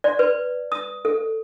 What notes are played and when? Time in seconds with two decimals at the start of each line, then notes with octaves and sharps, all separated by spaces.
0.04 D5
0.19 B4
0.72 D#6
1.05 A4